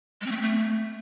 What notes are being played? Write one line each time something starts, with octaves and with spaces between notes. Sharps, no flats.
G#3
C4
A3
C4
A3